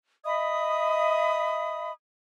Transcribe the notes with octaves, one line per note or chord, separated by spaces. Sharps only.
D#5 E5 B5 D#6